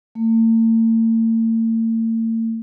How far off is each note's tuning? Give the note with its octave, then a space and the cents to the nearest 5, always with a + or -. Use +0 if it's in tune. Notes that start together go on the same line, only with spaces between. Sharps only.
A3 +45